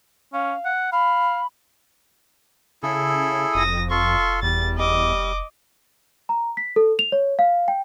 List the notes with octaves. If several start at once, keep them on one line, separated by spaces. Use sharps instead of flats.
C#4 F5
F#5
F5 B5
C#3 E4 G#4 A4
F1 F2 D#6 A#6
F4 A4 C6 C#6
E2 G3 A6
G3 D#5 D6
A#5
B6
A4
F7
C#5
F5
G5